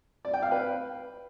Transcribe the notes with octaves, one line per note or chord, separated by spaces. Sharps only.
D5
G5
F5
B4